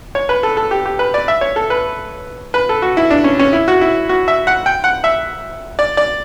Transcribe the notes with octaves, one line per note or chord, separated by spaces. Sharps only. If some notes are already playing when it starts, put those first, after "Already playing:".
C#5
B4
A4
A4
G4
G4
B4
D5
E5
C#5
A4
B4
B4
A4
F#4
E4
D4
C#4
C#4
E4
F#4
E4
F#4
E5
F#5
G5
F#5
E5
D5
D5